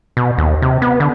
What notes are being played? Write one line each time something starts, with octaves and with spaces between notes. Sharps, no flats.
B2
D#2
C3
B3
D3